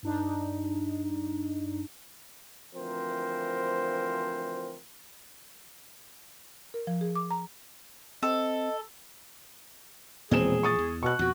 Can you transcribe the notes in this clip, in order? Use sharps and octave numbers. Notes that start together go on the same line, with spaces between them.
G2 D4 D#4
D2 E3 F3 C4 A#4 C5
A#4
F3
G#4
D6
A#5
C4 A4 D#5
E1 A#2 E3 F3 C4 G#4 E7
C#6 D#6 A6
E2
B2 C#6 F#6
F2 B2 F#4